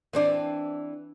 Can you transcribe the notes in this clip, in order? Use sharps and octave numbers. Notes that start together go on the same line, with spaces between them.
E3 C4 D4